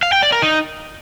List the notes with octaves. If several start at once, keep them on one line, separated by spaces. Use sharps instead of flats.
F5
G5
D5
A#4
D#4